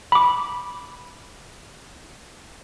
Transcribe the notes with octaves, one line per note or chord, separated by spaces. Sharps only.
B5 D6